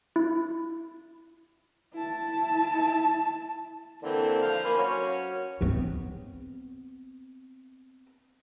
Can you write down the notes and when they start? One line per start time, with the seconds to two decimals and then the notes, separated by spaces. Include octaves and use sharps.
0.16 E4
1.93 E4 A5
4.02 D3 E3 A#3 C4
4.42 C5 F5
4.65 A#3 G#5 B5 C6
4.78 F#3 C#4
5.61 B3 C4